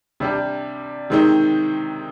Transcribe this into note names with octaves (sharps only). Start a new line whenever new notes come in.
C3 G3 D4 G4
C3 D#3 G#3 C4 D#4